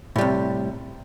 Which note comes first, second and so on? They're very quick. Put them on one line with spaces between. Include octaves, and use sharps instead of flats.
A2 G3 C3